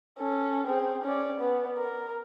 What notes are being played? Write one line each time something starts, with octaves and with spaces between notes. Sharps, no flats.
C#4 A4
C4 G#4
C#4 D5
B3
A#4